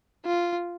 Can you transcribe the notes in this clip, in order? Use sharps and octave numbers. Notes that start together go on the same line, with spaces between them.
F4